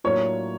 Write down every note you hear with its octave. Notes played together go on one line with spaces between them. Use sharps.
A2 F#3 A#3 D4 F4 C#5